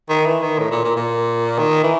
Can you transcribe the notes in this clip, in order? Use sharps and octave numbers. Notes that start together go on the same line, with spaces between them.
D#3
E3
D#3
A2
A#2
A#2
A#2
D#3
E3